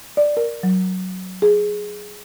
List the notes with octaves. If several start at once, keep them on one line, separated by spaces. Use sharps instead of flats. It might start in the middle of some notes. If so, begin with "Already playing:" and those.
D5
A#4
F#3
G#4